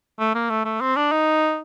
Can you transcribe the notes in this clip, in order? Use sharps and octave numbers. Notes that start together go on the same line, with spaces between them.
A3
A#3
A3
A3
C4
D4
D#4